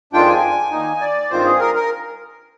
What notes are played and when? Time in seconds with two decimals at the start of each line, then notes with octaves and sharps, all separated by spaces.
0.13 F2 D#3 G#3 D4 F4 G5
0.28 G#5
0.71 D#3 A#3 D#4
1.01 D5
1.30 G2 D#3 G#3 C4 F4 C5
1.45 G#4
1.59 A#4
1.75 A#4